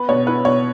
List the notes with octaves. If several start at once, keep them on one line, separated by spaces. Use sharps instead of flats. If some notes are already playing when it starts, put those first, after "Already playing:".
Already playing: B3 B4
B2 C#5
E4 B4
B2 C#5